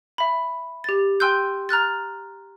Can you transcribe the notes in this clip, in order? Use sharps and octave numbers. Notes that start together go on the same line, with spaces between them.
E5 B5
G4 A6
G5 G#5 C6 E6 F#6 G6
A#5 F6 F#6 A6